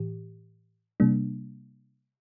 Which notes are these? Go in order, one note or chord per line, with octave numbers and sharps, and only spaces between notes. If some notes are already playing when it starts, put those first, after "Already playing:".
Already playing: A2 E3 G4
C3 G3 A#3 D4